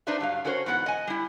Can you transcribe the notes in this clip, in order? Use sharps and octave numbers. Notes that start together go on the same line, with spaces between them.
D4 D#4 B4 C5 D5 E5
G2 F#3 F5
C#4 D4 F#4 A#4 C5 C#5
G#2 E3 B3 G#4 F#5
D#5 G#5
G3 E4